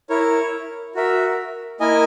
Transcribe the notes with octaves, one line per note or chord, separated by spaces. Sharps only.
E4 A#4 C#5
F#4 A#4 E5
A#3 E4 A#4 D#5 G#5